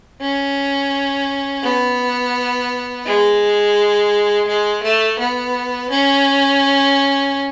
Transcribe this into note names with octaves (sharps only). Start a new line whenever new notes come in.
C#4
B3
G#3
G#3
A3
B3
C#4